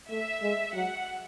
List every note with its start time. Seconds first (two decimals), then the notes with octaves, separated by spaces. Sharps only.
0.10 A3 E5
0.43 G#3
0.74 F#3 F#5